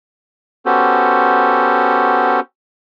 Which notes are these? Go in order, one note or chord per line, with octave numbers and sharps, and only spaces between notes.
B3 C#4 F#4 G4 A4 C5